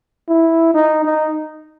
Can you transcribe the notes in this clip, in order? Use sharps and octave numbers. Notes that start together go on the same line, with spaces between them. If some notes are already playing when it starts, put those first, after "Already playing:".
E4
D#4
D#4